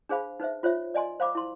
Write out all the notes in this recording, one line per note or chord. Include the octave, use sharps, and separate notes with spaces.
D4 G#4 C5 F5 B5
D#4 B4 C5 E5
F4 C5 C#5 E5
D5 D#5 G#5 C6
C5 F5 B5 D6
E4 C6